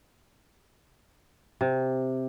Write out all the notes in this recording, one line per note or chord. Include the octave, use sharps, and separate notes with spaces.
C3